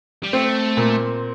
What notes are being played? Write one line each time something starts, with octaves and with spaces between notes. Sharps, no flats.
G3
A3 C4
A#2